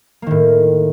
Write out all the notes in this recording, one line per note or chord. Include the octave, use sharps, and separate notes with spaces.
A2 D#3 A#3